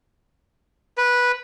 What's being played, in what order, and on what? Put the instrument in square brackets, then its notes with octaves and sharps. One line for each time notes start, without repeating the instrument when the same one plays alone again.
[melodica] B4